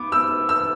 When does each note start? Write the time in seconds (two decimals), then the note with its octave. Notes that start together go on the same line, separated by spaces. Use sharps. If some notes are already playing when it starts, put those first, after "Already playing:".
Already playing: B3 D6
0.12 E6
0.49 E6